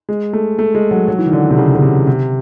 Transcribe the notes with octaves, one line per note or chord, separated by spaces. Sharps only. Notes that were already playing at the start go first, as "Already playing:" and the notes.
G#3
A3
A3
G#3
F#3
F#3
E3
D#3
D3
C3
C#3
C#3
C3
C3